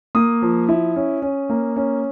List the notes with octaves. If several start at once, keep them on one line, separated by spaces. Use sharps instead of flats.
A#3 D#6
F3
E4
C#4
C#4
A#3
C#4